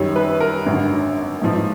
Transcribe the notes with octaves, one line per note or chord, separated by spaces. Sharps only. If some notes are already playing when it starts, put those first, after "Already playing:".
Already playing: F#2 D#3 G3 C#5
B4
A#4
G#1 F#2 D3
A1 G#2 F3